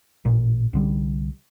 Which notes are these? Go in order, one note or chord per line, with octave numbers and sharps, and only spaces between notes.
A1 A#2
C2 D3 G3